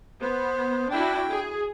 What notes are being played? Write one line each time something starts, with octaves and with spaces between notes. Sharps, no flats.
B3 C5
D4 E4 F#4 G5
G#4